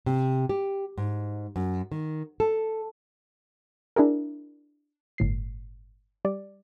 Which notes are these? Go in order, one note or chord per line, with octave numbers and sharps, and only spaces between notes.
C3
G4
G#2
F#2
D#3
A4
D4 E4 G#4 A#4
G1 A2 C7
G3 D5